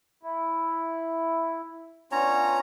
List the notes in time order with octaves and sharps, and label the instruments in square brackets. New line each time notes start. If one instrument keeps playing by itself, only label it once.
[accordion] E4
[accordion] B3 D4 F4 [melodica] C#4 C#5 A#5